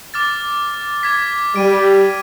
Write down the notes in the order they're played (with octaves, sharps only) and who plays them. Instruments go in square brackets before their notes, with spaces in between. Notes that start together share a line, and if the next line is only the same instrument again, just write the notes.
[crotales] D6 F6 A6
D6 G#6 B6
[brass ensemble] G3 [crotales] D7 D#7